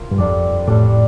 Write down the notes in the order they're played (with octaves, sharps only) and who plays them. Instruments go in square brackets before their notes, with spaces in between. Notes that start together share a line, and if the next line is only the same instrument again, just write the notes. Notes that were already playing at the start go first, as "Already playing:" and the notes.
Already playing: [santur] A#3 F4
[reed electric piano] G2
[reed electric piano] F2 [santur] G3 D4 A4 D5
[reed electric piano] A2 [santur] G3 D4 A4 D5